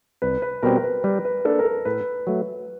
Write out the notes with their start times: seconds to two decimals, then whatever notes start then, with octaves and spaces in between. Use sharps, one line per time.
0.22 C2 B4
0.42 B4
0.63 B2 G3 C4 A#4
0.84 B4
1.04 G3 B4
1.25 B4
1.45 A#3 D4 A4
1.59 A#4
1.65 A4
1.85 A2 B4
2.27 F#3 A3